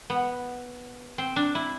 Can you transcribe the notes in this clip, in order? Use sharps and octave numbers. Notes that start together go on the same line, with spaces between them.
B3
C4
D4
E4